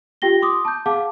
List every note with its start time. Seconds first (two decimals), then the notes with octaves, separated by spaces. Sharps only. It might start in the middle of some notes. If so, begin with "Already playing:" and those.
0.22 F4 G4 G5 A#6 G7
0.42 C6 D6 D#6
0.65 A5 G6
0.86 G#4 F5 F#5 A5 D6